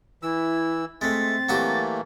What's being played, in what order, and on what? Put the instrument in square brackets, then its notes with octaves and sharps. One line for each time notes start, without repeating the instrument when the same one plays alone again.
[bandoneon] E3 E6 [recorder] E4
[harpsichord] G#3 A3 [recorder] C4 [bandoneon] E5 [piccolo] A6
[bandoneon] E3 A3 A#3 [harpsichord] F#3 F#4 G4